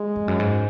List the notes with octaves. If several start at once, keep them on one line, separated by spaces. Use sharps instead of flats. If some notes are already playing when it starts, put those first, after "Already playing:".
Already playing: G#3
F2
F#2
G#2